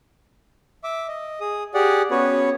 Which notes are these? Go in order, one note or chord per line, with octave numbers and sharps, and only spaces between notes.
E5 D6
D#5
G#4 D#6
G4 G#4 D5 F#5
B3 C#4 F#4 B4 C#5